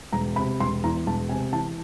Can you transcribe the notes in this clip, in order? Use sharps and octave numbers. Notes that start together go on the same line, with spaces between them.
E1 A#5
C3 B5
E1 C6
E2 A#5
E1 A5
C3 G#5
E3 A5